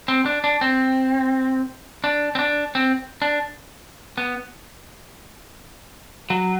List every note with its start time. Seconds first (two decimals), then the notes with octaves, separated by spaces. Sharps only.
0.08 C4
0.26 D4
0.44 D4
0.61 C4
2.04 D4
2.35 C4
2.39 D4
2.75 C4
3.22 D4
4.18 B3
6.30 F#3